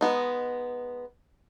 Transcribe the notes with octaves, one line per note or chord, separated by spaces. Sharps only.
G#3 B3 D#4